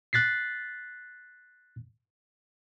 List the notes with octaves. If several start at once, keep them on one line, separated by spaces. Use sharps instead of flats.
F#6 A6 B6 C7